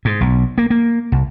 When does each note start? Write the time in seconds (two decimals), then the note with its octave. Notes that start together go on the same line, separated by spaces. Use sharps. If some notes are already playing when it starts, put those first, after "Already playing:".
0.05 G#2
0.21 B1
0.58 A#3
0.70 A#3
1.12 C2